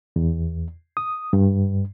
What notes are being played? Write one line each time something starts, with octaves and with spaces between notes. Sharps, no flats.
E2
D#6
G2